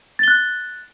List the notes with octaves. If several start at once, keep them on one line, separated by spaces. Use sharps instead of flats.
F#6 A6 G7